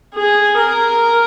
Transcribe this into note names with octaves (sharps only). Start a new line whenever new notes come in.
G#4
A#4